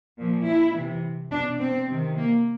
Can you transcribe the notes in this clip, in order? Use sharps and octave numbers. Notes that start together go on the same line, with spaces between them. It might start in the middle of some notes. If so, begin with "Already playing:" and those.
A#2 F3
E4
C3 E3
B2 D4
C4
C3 D#3
A#3